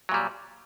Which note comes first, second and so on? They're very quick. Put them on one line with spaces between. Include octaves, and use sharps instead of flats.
F#3 A#2 G3